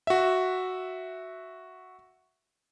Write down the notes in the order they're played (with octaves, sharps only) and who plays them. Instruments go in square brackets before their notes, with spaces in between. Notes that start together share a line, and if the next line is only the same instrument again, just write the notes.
[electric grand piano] F#4 E5